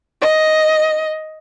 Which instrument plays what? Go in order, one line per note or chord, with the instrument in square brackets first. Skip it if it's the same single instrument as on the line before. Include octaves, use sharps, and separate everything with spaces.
[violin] D#5